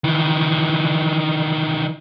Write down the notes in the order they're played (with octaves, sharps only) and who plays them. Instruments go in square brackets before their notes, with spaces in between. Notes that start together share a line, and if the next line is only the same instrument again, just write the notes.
[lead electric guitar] D#3 E3